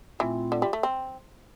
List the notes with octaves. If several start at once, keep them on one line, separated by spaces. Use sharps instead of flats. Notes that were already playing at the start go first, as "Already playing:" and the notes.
A#2 E3 A3 C4 F4
D3
G3
A3
C4